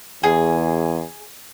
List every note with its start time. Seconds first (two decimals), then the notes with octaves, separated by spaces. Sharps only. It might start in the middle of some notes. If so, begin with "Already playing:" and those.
0.24 E2 G#4